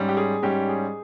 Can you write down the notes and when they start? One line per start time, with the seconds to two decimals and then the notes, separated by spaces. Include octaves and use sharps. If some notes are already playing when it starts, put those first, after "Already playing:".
Already playing: G#2 G3 C#4
0.09 G4
0.17 G#4
0.42 G#2 G3 C#4 G4
0.69 G#4